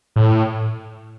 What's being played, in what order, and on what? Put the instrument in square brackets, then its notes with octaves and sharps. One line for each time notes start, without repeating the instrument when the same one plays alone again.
[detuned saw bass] A2